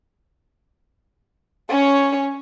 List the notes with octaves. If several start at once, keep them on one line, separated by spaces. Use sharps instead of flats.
C#4 C#5